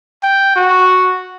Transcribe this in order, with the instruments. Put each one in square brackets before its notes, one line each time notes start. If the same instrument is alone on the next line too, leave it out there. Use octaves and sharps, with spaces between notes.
[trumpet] G5
F#4